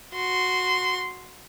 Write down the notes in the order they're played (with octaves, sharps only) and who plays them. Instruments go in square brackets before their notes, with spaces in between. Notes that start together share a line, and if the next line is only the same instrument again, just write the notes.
[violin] F#4 C6